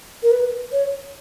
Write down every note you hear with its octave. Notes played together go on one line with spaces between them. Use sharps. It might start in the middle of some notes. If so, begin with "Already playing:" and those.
A#4
B4
C#5